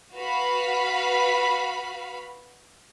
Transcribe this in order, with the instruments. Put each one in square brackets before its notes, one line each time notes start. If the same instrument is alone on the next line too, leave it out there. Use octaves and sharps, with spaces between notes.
[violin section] F#4 B4 F5 B5